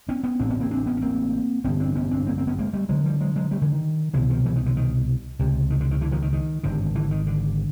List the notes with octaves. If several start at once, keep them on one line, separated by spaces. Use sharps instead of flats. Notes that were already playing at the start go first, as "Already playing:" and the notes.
B3 C#4
B3 C#4
A1 A2 C4 D4
B3 C#4
A#3 C4
C4 D4
B3 C#4
C#4
A#3 C4
A1 G2 D3 B3 C#4
C4 D4
B3 C#4
C4 D4
A#3 C4
A#3 C4
B3 C#4
G#3 A#3
G3 A3
D2 D3 F#3 G#3
F3 G3
F#3 G#3
F#3 G#3
G3 A3
D3 E3
D#3
C2 B2 D3 E3
D#3 F3
E3 F#3
D#3
D3
D#3
C#2 C3
D#3
D3
D#3
D3 E3
D#3 F3
D#3
D#3
G#1 G2 D3
D3 E3
D#3
D3